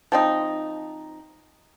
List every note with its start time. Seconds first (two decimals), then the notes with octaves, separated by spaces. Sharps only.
0.12 F3 C4 D#4